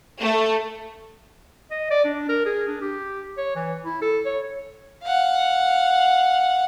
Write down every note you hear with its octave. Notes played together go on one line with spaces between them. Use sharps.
A3
D#5
D5
D4
A#4
G#4
D4
G4
C#5
E3
E4
A4
C#5
F5 F#5